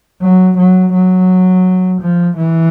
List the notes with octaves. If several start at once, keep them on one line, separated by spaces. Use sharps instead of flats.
F#3
F#3
F#3
F3
E3